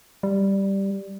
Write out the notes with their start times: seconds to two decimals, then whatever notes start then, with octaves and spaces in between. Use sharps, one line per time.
0.23 G3